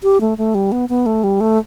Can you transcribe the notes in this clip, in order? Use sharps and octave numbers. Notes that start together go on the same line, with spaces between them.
G4
A3
A3
G3
B3
B3
A3
G3
A3